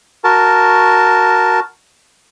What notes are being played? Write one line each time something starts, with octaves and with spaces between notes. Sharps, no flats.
F#4 A#4 A5